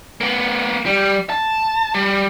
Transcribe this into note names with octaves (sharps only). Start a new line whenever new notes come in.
A#3 B3
G3
A5
G3